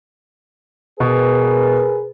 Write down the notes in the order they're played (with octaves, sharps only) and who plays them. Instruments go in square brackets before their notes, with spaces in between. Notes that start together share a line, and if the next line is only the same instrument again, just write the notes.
[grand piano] B2 [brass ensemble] G#4 A#4 B4